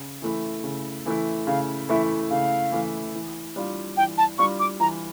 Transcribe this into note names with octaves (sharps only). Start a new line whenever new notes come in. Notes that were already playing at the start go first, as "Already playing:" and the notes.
Already playing: C#3
E3 A3 E4
C#3
E3 A3 E4
C#3 F5
E3 A3 E4 E5
C#3 F5
E3 A3 E4
E3
G3 D4 F4
E3 G5
A5
G3 D4 F4 C#6
D6
E3 A#5